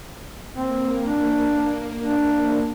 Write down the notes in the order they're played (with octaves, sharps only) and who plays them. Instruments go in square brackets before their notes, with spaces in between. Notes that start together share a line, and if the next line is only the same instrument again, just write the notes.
[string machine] A#3 [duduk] C4
[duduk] D4
D4